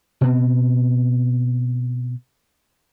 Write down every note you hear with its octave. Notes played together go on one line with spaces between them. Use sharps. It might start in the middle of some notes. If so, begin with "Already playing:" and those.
B2 B3 C4